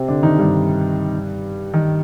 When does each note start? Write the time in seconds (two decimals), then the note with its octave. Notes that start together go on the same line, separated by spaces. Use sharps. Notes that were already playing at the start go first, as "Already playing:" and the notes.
Already playing: C3 C4
0.08 D3 D4
0.23 D#3 D#4
0.39 G2 G3
1.74 D#3